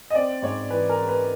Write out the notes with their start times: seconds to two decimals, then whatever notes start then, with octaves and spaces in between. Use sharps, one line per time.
0.10 D#5
0.15 C4 D5
0.42 G#2 C#5
0.70 E3 B4
0.89 A#4
0.99 G#3
1.08 B4